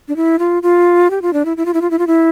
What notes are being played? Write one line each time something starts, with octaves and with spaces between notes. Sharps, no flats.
D4
E4
F4
F4
G4
F4
D4
E4
E4
F4
E4
F4
E4
F4
E4